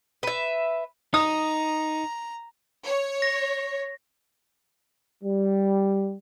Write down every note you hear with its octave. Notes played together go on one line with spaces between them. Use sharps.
B4 E5
D#4 A#5 D#6
C#5
A#6
G3